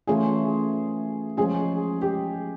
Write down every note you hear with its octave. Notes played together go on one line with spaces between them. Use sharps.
E3 A3 C#4 F4 G#4
F3 G#3 C#4 F4 G#4
G4